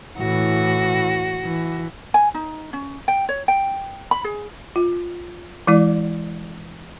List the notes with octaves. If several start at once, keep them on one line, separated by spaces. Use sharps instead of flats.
A2 E3 F#4
E3
G#5
D#4
C#4
G5
C#5
G5
B5
G#4
F4
E3 G#3 E4 D5